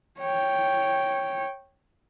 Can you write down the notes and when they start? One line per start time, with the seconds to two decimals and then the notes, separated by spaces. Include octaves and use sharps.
0.20 C#5 G5